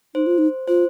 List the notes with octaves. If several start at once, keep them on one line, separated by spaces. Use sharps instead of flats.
D#4 C5
F4
D#4
F4 C5